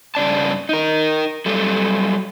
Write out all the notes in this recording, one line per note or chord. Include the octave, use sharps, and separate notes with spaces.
G2 C#3 D5 A5
D#4 A#4
F#3 G3 A4